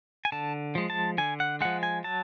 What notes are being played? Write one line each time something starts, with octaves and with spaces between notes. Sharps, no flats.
G#5
D3 A5
F3 G#3
A5
D3 G#5
F#5
F3 G#3 F#5
G#5
F#3 A5